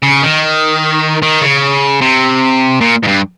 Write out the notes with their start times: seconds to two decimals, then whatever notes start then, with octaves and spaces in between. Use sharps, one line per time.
0.03 C#3
0.22 D#3
1.22 D#3
1.42 C#3
2.01 C3
2.81 A#2
3.04 G#2
3.08 G2